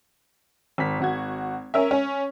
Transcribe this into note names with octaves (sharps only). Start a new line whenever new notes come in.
G#1 B6
G#1 F#4 G#6
C#4 A#4 E5
C#4